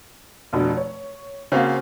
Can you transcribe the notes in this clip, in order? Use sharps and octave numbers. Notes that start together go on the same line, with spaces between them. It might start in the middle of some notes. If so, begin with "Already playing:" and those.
F1 B2 D3
C#5
C#3 A#3 C4 F#4 F5